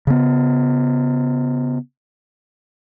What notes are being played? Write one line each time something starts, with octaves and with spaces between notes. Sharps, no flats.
C#3 B3